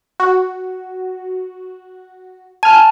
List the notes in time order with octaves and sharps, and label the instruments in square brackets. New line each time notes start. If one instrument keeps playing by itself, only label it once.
[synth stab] F#4
[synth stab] G#5 F6 [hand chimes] A5